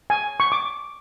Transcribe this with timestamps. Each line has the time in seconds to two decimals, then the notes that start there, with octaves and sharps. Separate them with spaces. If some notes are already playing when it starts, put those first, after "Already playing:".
0.10 G#5
0.40 C#6
0.52 D6